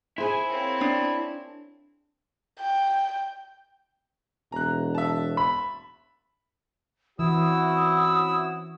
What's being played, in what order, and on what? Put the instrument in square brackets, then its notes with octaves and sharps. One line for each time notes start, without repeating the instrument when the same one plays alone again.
[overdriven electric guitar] E4 [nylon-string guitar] G#4 C5 [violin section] G#5
[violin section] A#3 C4 C#5
[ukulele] D4
[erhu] G5
[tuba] E1 [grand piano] A#5 F#6
[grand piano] E5 A5
[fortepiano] B5
[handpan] E3 [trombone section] C4 C#4 F#4 [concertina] E4 E6 [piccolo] D#6